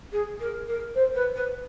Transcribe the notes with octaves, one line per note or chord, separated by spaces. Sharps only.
G#4
A#4
A#4
C5
B4
B4